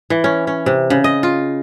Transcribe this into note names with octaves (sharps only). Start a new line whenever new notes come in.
E3
C#4
C#4
C3
C#3
D#5
F4